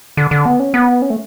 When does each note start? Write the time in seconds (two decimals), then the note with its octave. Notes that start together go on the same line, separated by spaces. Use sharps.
0.17 D3
0.31 D3
0.46 B3
0.60 C#4
0.74 B3
1.02 C#4
1.10 A3